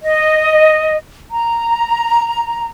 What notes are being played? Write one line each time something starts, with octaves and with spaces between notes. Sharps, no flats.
D#5
A#5